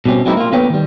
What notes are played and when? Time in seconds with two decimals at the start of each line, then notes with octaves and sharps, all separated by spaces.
0.06 B2 G3 C4 C#4
0.26 F#3 G#3 A#3 C4 D#4 E4
0.37 A#3 F4
0.52 D3 A#3 B3 B4 C#5 G5
0.70 D#3 G3